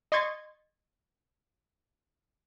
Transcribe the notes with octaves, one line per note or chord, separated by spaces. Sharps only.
D#5 C6 C#6 G#6 A6